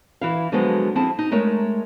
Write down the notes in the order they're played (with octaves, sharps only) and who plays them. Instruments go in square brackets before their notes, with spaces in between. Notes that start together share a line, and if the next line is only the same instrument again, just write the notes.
[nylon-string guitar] E3 E4 F5
D3 F3 F#3 G#3 B3
F3 C4 E4 G#4 A5
D#4
G#3 A3 A#4 C#5